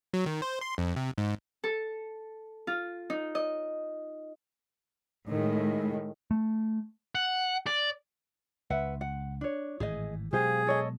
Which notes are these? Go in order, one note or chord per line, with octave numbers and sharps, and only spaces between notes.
F#3
D#3
C5
C6
F2
C3
G#2
A4
F4
D#4
D#5
A2 D#3 G#3
A3
F#5
D5
C#2 B4 E5 F#5
F#5
D4 C#5
G#1 A2 E3 G#4 D#5
B2 F#3 G#3 G4 G#4 C5 F5
A4 C#5 D#5